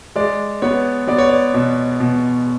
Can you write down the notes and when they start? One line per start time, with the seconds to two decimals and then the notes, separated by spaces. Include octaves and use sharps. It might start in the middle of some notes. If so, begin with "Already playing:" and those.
0.16 G#3 D5
0.62 B3 C#5
1.08 B3 D5
1.18 C#5
1.29 D5
1.54 B2
2.00 B2